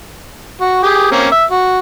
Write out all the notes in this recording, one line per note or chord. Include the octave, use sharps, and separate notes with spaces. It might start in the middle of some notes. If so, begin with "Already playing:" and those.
F#4
G4 G#4
A#3 C4 C#4
E5
F#4